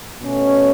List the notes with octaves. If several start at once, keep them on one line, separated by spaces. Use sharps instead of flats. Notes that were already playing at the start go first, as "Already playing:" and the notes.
B2 A3 C#4 F#4